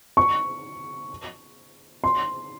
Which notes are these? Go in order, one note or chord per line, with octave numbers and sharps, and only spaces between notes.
C#6
C6